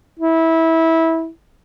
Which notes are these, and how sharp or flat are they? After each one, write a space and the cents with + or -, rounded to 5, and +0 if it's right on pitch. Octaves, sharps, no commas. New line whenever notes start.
E4 -20